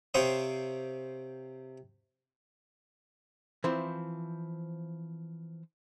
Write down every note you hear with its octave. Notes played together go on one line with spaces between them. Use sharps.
C3 C5 C#5 F5 G5 D#6
E3 F3 C4 E4